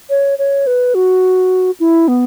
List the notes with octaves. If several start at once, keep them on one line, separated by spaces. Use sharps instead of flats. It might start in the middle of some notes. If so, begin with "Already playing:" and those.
C#5
C#5
B4
F#4
E4
B3